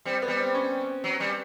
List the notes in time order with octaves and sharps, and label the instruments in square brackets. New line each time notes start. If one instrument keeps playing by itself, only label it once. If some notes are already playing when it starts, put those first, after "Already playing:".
[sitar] G3 [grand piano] C4
[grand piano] B3
[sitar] G3
[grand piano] C4
C#4
[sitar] F#3
G3